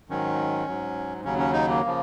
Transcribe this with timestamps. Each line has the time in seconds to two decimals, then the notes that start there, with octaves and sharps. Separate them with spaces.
0.09 G#2 D#3 F#3 C#4
0.67 G#2 F#3
1.24 D#2 C#3 F#3 C#4
1.38 C#4
1.53 D#4
1.68 A#3
1.85 C#3 F3